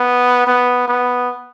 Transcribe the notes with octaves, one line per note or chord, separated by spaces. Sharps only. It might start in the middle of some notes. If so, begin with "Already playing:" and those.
Already playing: B3
B3
B3